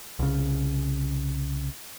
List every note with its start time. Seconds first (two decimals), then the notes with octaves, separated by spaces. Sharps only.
0.19 C2 C#3